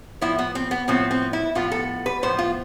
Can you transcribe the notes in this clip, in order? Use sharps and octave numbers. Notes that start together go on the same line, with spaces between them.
A2 F3 B3 E4
B3
C4
B3
A2 F3 B3 C4
C4
E4
A2 F3 B3 F4
A4
B4
A2 F3 B3 C5
F4